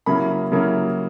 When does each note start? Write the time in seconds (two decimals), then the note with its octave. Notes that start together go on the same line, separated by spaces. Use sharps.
0.06 C#3 F#3 A#3 C#4 E4 B5
0.52 C#3 F#3 A#3 C#4 E4